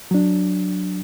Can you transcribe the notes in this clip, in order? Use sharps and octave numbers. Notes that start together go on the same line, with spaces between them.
F#3 D4